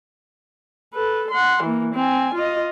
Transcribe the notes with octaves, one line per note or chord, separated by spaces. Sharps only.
A4 B4
F#5 C6
E3 A#3
C4 G#5
F4 D#5